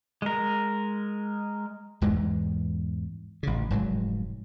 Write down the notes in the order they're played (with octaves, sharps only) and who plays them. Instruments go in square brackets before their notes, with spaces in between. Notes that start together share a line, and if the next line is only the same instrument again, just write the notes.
[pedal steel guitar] G#3 A#4
[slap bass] E2 G#2 E3 G#3
A1 C#3
F1 G#2 F#3